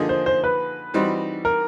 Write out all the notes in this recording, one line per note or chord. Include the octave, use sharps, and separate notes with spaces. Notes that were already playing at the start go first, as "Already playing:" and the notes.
Already playing: D3 F3 A#3 D#4 G#4
C5
C5
B4
E3 G3 C4 D#4 F#4
A#4